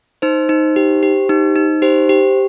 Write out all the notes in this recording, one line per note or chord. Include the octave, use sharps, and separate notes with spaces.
D#4 C5
D#4
G4
G4
D#4
D#4
G4 C5
G4